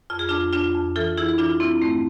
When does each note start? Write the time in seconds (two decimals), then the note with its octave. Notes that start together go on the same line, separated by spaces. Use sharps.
0.10 F2 F4
0.19 G#4
0.29 F2 D4 F4
0.53 F2 D4 F4
0.75 F2
0.96 E3 F4 A4
1.17 E3 E4 G#4
1.38 E3 D4 F4
1.60 E3 C4 E4
1.82 G#2 A3 C4